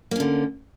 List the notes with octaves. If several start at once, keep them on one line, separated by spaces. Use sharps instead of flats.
D3 A#3 C#4